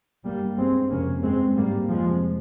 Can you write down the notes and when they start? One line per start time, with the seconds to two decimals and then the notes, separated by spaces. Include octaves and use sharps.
0.24 G2 G3 A#3
0.57 G2 G#3 C4
0.90 F2 C3 A#3 C#4
1.23 G2 G#3 C4
1.57 G#2 G3 A#3
1.89 F2 C3 F3 G#3